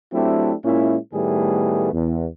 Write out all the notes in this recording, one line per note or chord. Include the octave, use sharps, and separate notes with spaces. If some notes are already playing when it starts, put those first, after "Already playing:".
F#3 A3 C4 D4 E4 G4
A#2 G#3 C#4 E4
A2 D#3 G3 A3 B3 G#4
E2